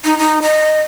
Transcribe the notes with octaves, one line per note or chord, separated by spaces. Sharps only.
D#4
D#4
D#5